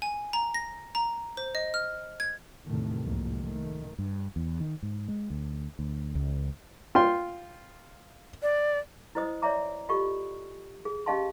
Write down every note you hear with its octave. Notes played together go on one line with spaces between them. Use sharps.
G#5
A#5
A#6
A#5
C5
D#5
F6
G#6
E2 A2 C3 D#3 A3
C2 F2 G#2 A#3
D#3 A3
G2
E2
D#3
G#2
G#3
D2
D2
C#2
F4 G5 C6
D5
E4 B4 C5 D#5 D#6
C#5 D5 E5 A#5 D6
F4 G4 A4 D#5 C#6
G#4
C#4 G4 D#5 F5 A5 C6